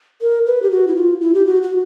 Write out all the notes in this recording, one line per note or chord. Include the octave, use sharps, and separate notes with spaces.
A#4
B4
G4
F#4
E4
F4
E4
G4
F#4
F#4